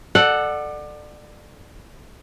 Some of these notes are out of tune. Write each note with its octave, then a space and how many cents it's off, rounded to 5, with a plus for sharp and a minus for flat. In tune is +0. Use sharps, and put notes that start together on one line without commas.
A4 +0 D5 +30 F#5 +0